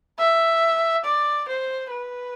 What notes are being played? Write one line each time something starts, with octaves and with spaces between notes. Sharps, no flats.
E5
D5
C5
B4